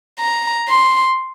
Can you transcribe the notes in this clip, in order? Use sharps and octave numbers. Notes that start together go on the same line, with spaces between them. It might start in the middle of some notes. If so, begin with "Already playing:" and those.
A#5
C6